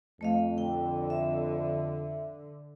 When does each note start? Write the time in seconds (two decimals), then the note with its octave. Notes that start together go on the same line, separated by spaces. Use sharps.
0.21 F2 A3 D#5 F5
0.58 D3 G5
1.10 E5